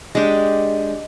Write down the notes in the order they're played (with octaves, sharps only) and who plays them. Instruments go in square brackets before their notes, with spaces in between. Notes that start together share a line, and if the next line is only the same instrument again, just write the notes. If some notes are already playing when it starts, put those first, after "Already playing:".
[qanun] G#3 D4 G4